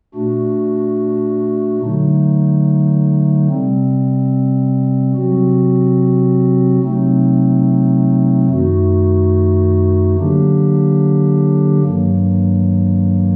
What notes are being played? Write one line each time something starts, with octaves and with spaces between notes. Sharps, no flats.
A#2 A3 D4 F#4
D3 F#3 A3 D#4
C3 G3 C4
C3 F#3 C4 F#4
C3 F#3 A3 C4 D#4
F#2 D#3 A3 D#4 F#4
D3 F#3 A#3 D4 G4
G2 D#3 F#3 A#3